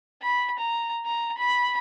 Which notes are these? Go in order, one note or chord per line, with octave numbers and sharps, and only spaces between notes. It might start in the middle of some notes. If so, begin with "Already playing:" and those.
B5
A#5
A#5
B5